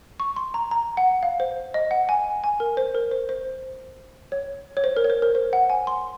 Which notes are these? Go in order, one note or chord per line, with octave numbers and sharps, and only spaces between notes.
C#6
C6
A#5
A#5
F#5
F5
C5
D#5
F#5
G#5
G#5
A#4
C5
A#4
C5
C5
C#5
C#5
C5
A#4
C#5
C5
A#4
C5
F#5
G#5
C6